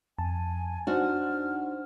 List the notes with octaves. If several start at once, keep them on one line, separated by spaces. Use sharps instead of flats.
F2 G#5 A5
D4 D#4 F#4 C5 F#5 F6